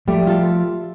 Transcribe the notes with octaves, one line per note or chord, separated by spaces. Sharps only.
F3 G3 A3
F4 A4